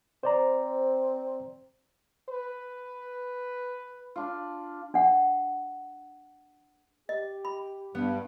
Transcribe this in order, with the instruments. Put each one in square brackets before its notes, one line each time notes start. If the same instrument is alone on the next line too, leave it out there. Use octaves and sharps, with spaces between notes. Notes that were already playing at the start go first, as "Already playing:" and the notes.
[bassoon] C4 [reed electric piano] C5 D5 A#5
[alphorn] B4
[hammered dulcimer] D4 F4
[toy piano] D4 F#5
[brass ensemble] G4 [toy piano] D#5
[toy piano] B5
[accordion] G2 [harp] B3